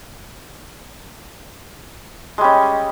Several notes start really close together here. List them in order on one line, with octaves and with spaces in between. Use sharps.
G#3 G3 C#4